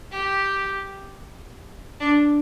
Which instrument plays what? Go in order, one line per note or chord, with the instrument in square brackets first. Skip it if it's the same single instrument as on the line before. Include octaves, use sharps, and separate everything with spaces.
[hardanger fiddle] G4
D4